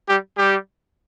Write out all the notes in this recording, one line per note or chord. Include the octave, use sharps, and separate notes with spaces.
G3 G4
G3 G4